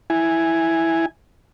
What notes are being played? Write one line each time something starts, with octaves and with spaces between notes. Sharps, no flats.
E4 G#5